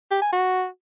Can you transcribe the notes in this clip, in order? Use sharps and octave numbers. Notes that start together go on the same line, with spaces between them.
G4
G#5
F#4